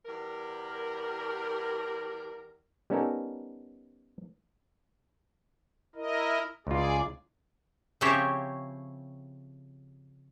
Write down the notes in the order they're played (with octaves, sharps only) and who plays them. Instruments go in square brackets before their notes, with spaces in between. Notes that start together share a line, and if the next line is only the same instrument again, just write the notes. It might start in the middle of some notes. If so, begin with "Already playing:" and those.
[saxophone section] E2 G3 A#4
[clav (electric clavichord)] G3 B3 C#4 D#4 A4 A#4
[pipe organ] E4 A#4 D#5
[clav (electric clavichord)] C#2 F4 [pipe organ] G#4 D5
[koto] C#3 F3 C4 E4 G4 C#5